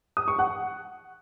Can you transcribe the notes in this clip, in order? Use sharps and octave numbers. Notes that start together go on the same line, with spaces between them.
D#6
C#6
F#5